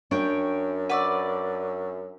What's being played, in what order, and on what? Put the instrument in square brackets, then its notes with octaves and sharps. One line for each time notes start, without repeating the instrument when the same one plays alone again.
[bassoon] F#2 [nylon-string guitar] D4 [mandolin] C#5 G5
[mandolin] B4 D5 [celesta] F#5 C#6 E6